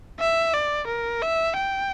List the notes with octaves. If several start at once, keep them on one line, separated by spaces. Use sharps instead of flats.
E5
D5
A#4
E5
G5